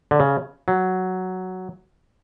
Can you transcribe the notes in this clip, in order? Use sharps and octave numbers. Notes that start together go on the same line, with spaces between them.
D3
C#3
F#3